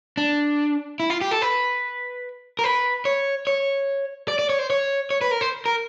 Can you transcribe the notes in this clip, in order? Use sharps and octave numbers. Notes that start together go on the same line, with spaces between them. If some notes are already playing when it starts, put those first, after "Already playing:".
D4
E4
F4
G4
A4
B4
A#4
B4
C#5
C#5
D5
D5
C#5
C5
C#5
C#5
B4
A#4
C5
A#4